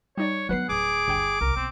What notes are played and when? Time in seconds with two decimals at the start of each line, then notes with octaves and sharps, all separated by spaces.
0.18 G3 D#4 C#5 D5
0.49 F#3 B3 D4 B4 F#5 C7
0.69 D1 G#4 D6
1.08 G1 G5 D7
1.41 C2 A#4
1.56 B1 C4